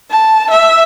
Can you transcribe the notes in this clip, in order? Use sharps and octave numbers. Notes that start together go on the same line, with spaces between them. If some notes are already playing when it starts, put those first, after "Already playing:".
A5
E5